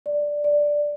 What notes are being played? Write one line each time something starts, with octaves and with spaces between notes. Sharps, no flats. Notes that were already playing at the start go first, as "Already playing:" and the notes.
D5
D5